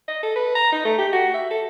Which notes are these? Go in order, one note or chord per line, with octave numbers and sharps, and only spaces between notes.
D#5
A4
B4
A#5
D#4
A3
G4
F#4
E5
A4